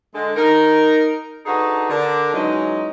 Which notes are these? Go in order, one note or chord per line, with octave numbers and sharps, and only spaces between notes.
D3 G#3 A4
D#4 A#4
D4 D#4 F#4 G#4 A4 B4
D3 D4 A#4
E3 F#3 G#3 C#4 D#4